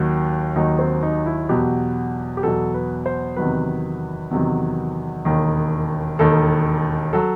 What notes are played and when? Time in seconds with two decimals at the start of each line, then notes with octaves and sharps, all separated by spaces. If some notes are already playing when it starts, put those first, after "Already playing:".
Already playing: D#2 D#3 F#3
0.56 D#2 D#3 F#3 D#4
0.79 C4
1.03 D#4
1.26 E4
1.49 E2 B2 F#3 G4
2.37 G4
2.43 E2 B2 F#3 A4
2.74 B4
3.06 C5
3.36 E2 C3 D#3 F#3 B4
4.31 E2 C3 D#3 F#3
5.25 E1 D#2 D#3
6.19 E1 D#2 D#3 A4
7.13 F#3 A4